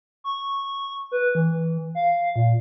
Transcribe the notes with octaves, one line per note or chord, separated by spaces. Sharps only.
C#6
B4
E3
F5
A#2